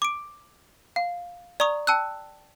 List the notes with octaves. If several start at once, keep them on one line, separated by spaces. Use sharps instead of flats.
D6 D7
F5
D5 A#5 C#6 D#6 F7
G5 A5 E6 F#6